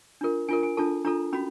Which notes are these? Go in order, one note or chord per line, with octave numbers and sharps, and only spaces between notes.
D4 F4 A#4
D4 F4 A#4 G#5
G#5
D4 F4 A4 A5
D4 F4 A4 A#5
C#4 F#4 B5